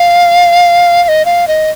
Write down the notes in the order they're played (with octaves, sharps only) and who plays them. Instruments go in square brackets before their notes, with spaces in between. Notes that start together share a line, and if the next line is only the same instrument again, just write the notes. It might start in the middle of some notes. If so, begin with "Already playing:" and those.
Already playing: [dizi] F5
F5
D#5
F5
D#5